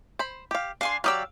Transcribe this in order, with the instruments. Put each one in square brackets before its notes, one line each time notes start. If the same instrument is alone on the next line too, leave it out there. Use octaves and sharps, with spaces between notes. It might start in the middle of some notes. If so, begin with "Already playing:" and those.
[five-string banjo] C5 B5
G4 F5
[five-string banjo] D4 [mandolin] F5 G#5 C6
[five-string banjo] F#3 G4 D5 [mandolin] F5 D#6 E6